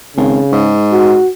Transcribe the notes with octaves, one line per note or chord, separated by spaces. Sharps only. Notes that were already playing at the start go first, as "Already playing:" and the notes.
G#1 C#3
G#2
F#4